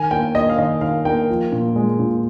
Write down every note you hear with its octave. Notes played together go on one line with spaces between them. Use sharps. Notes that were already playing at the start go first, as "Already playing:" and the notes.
Already playing: D#3 G#5
A#3 G5
A#3 D#5
F5
D#3 D#5
D#3 F5
A#3 G5
F3
A#2
G#3
A#2